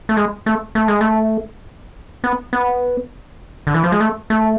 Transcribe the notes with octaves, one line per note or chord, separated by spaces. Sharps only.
A3
G#3
A3
A3
G#3
A3
B3
B3
D3
E3
F3
G#3
A3
A3